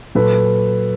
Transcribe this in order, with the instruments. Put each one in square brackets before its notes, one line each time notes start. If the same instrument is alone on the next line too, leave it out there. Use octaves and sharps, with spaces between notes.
[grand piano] A#2 F#3 A4 B4